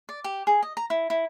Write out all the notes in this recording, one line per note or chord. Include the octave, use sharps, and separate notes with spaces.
D5
G4
G#4
D#5
A#5
E4
E4